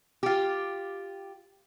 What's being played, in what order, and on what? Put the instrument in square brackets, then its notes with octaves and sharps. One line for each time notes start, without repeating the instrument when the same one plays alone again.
[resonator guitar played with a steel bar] F4 G4